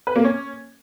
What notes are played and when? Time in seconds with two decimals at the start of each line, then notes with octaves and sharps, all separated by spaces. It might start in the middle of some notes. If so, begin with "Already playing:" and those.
0.07 B4
0.16 A#3
0.24 C#4